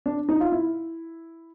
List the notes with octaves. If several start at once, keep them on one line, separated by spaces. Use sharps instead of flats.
D4
D#4
F4
E4